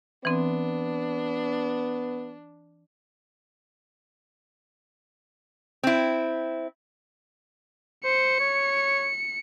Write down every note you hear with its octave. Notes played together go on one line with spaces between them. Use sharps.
E3 B3 C4 D4
C4 E4
C5 C#7
C#5